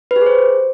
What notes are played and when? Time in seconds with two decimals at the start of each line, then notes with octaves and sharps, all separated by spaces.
0.11 B4
0.16 G4
0.21 G#4
0.26 C5